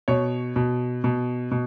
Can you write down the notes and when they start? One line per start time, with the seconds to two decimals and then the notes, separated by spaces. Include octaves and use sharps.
0.08 B2 C#5
0.56 B2
1.04 B2
1.51 B2